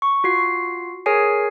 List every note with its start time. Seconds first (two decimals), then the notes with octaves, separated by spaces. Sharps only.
0.02 C#6
0.24 F4 F#4 C7
1.06 G#4 A#4 C#5 G#5 C7